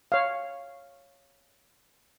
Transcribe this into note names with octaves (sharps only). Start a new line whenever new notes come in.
C#5 F5